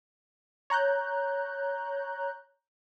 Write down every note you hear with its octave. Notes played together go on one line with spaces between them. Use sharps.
C#5 A#5 F#6 G6